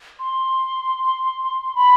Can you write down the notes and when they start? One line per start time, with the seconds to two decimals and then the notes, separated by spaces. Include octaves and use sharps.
0.19 C6
1.75 B5